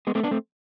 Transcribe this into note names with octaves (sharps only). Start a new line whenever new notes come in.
G#3 B3
A3 C4
B3 D4
A3 C4